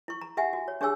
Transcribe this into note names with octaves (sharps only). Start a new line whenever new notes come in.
E4 C#6
A#5
G4 E5 F#5 G#5
F#4
C#5
D4 G4 G#4 C#5 G#5 E6